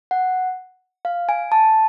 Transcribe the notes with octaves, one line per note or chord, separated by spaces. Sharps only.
F#5
F5
G#5
A5